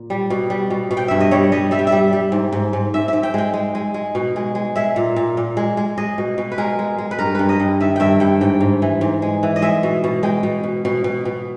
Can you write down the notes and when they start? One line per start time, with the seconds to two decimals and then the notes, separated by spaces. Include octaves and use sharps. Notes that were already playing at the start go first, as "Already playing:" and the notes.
Already playing: A#2
0.10 G3
0.30 B2
0.50 G3
0.70 B2
0.91 B2
0.97 G5
1.08 G2 E5
1.21 D#5
1.31 G3 C#5
1.52 G3 D#5
1.71 G3 E5
1.79 G5
1.87 E5
1.92 G3
2.13 G3
2.32 G#2
2.53 G#2
2.73 G#2
2.94 G#2 E5
3.08 G#2 E5
3.23 G5
3.34 G#3 G5
3.54 G#3
3.75 G#3
3.94 G#3
4.15 B2
4.36 G#3
4.55 G#3
4.76 G#3 E5
4.96 A#2
5.16 A#2
5.37 A#2
5.57 G#3
5.77 G#3
5.98 G#3 D#5
6.18 B2
6.38 B2
6.52 B4
6.58 G#3 A#4
6.79 G#3
6.98 G#3
7.11 B4
7.19 G2 A#4
7.35 G2 B4
7.49 D#5
7.60 G2
7.80 D#3 E5
7.96 G2 E5 G5
8.20 G2 G5
8.41 G#2 G5
8.61 G#2
8.82 E3
9.01 G#2
9.22 G#3
9.43 E3
9.56 D#5
9.62 G#3 E5
9.83 B2
10.04 B2
10.23 G#3 G5
10.43 B2
10.64 B2
10.85 B2
11.04 B2
11.25 B2